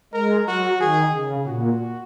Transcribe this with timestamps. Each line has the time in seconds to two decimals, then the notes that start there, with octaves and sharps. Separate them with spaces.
0.14 G#3 A#4
0.47 F#3 F#4
0.81 D#3 G#4
1.13 C#3
1.46 A#2 F#4